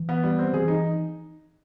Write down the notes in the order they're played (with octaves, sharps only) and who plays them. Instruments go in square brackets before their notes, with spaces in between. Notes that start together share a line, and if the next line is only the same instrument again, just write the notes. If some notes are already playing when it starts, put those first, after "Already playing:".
Already playing: [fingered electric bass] E3
[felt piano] B3
G3
C4
[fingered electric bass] E3 [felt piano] G#4
[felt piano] D#4